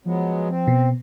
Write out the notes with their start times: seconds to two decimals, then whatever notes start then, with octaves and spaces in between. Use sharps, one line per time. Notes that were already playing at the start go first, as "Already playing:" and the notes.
0.05 F3 F#3 G#3 B3
0.50 C4
0.67 B2